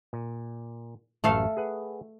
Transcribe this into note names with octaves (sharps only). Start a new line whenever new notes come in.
A#2
A1 F#2 A3 A4 F5
G#4 B4 F#5